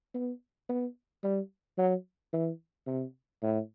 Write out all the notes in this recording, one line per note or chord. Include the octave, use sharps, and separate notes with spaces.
B3
B3
G3
F#3
E3
C3
A2